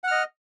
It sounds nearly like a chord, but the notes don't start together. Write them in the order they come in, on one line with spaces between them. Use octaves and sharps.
F#5 F6 D#5